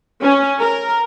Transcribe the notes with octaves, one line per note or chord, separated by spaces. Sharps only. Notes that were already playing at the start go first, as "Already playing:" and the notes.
C#4
A#4